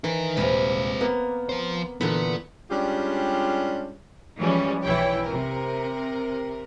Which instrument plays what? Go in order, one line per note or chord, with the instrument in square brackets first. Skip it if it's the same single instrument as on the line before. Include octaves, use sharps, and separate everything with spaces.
[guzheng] E3 [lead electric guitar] D#4 A#4
[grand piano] D#1 [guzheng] C3 F5 [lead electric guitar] G#3 B4
[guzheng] A#3 [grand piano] B3
[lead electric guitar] F3 C5
[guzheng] A#2 D3 [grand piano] E3 [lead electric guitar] B3
[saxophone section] G3 G#3 C#4 D4 F4 G4
[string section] E3 F3 G3 G#3 C#4
B1 E3 E4 C#5 G5
C3 A#4